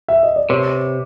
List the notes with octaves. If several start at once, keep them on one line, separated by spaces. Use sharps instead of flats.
E5
D#5
D5
C3 B4 C#5